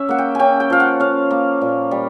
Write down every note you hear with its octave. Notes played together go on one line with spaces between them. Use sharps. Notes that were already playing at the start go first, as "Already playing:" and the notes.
Already playing: C#4 E5
A#3 F#5
G5
C#4 G5 G#5
G5
F3 F5
F#5
C#4 F5
A#3
A#2
G3